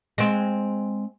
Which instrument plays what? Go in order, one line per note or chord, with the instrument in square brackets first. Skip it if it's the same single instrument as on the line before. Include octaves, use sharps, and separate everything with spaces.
[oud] G#3 C4